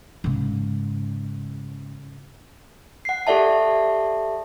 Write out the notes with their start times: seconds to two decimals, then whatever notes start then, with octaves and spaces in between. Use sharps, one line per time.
0.24 G#2 C#3
3.05 F#5 C7
3.27 G4 A4 D5 E5 A5